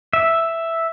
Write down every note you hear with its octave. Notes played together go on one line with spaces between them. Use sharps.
E5